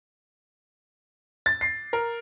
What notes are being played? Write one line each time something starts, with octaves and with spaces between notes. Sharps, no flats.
A6
C7
A#4